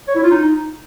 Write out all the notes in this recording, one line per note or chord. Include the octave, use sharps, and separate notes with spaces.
C#5
E4
F4
D#4